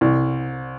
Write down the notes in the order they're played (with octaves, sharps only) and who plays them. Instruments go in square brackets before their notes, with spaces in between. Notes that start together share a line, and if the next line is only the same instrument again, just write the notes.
[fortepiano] C2